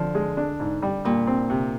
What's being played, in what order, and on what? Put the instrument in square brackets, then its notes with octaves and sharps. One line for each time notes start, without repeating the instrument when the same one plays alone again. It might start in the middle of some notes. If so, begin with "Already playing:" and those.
Already playing: [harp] D3 [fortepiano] F3
[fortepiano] G#3
D4
G#2
G3
[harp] A#2 [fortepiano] G3
[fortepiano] C4
C3